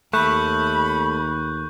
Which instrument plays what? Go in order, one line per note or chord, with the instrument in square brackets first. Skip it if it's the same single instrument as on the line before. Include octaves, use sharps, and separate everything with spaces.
[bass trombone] D#2 [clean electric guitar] A3 [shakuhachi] B5 [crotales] C#6 F#6 G6